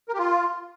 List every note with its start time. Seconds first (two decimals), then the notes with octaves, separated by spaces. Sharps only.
0.09 A#4
0.14 G4
0.19 F4